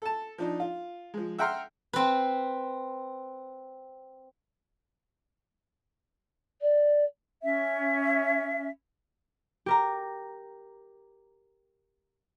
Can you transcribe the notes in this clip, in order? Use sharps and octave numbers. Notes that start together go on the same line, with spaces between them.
A4 A5
F3 D4 D#4
F4
F3 G#3
E5 F#5 G5 A#5 C6 F6
C4 B4
D5
C#4 E5
G4 A#4 A#5